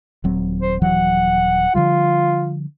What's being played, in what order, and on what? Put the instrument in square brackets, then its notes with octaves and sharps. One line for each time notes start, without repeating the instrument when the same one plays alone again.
[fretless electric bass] D#1 F#3 C4
[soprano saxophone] C5
[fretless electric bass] D#1 E3 F#3 [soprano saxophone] F#5
[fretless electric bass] D3 F3 G3 [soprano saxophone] F4